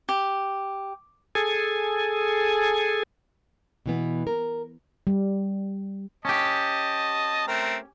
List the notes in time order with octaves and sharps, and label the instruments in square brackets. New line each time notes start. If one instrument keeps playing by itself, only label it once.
[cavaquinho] G4
[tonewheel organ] G#4 A4 G#5
[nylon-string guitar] B2 E3 B3
A#4
[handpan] G3
[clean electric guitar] C#4 G4 [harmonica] D#5 A5
[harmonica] A3 C4 A#4